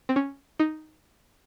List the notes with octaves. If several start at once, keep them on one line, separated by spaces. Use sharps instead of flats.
C4
C#4
D#4